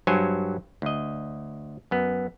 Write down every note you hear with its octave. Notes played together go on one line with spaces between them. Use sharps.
G2 F#3 C5 C#5 G#5
D2 D#5
F#2 B3